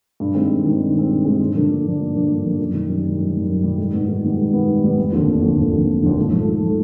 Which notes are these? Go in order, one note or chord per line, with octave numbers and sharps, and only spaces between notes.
G2
D#3 G#3 C4
G2
D#3 G#3 C4
G2
D#3 G#3 C4
G2
D#3 G#3 C4
G2
D3 F3 A#3 D4
G2
D3 F3 A#3 D4
G2
D3 F3 A#3 D4
G2
D3 F3 A#3 D4
F#2
D#3 G3
F#2
D#3 G3
F#2
D#3 G3
F#2
D#3 G3
G#2
D#3 G3 B3
G#2
D#3 G3 B3
G#2
D#3 G3 B3
G#2
D#3 G3 B3
F1
D#2 D3 F3
F1
D#2 D3 F3
F1
D#2 D3 F3
F1
D#2 D3 F3
G#2
F3 A3
G#2
F3 A3